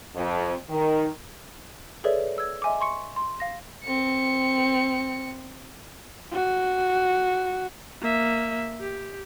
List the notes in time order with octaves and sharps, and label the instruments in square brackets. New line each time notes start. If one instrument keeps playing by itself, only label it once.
[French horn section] F2
D#3
[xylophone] G#4 A4 B4 C#5 D5 E5
E6 G#6
D#5 E5 G#5 C6 D6
C6 C#6 C#7
C6
F5 A#6
[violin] C4 C#7
[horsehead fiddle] F#4
[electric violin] A#3 E5
G4